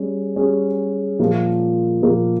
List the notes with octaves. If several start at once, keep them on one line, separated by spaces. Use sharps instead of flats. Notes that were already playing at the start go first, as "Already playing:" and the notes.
Already playing: G3 C#4 G#4
G3 C#4 G#4
A#2 F3 A#3 F4
A#2 F3 A#3 F4